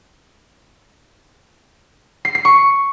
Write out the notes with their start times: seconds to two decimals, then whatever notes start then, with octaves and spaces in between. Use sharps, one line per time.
2.25 C7
2.35 C7
2.45 C#6